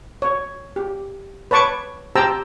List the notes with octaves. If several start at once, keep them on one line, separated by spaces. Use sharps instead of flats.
C#5
G4
B4 C#5 A5 C#6 D6
G4 C5 G5 A5 A#5 E6